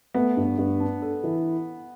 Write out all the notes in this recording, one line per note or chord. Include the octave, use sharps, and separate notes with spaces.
A3 B3
G2
G2
D4
A4
E3